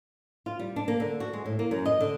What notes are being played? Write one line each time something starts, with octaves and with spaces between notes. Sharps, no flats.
F4
G3
D4
A#3
D3
F#4
G#3
A2
A#3
F#2
D#5
D3